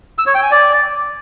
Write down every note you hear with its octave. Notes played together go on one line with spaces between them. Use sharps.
E6
C#5
G5
G#5
D5